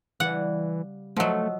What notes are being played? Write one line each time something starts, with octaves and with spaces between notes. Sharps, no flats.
C#3 E3 G3 D5 F#5
F3 F#3 A3 D#5 F#5 E6